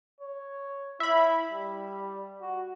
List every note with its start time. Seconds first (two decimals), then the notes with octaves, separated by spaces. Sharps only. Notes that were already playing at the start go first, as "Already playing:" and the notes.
0.21 C#5
1.00 E4 E5 B5
1.50 G3
2.41 F#4